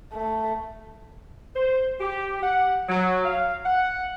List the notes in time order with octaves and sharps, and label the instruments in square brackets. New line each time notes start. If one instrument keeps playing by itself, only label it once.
[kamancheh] A3
[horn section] C5
G4
F#5
F#3
F5
F#5